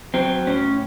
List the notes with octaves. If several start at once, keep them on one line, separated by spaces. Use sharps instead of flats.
F#3 C4
A2 C#4